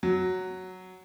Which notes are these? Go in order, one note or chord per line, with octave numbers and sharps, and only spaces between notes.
F#3